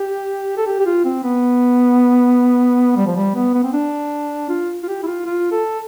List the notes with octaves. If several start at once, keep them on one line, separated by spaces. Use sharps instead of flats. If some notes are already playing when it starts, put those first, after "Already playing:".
Already playing: G4
A4
G4
G4
F4
C4
B3
G3
F3
G3
B3
B3
C4
D4
F4
F4
G4
E4
F4
F4
A4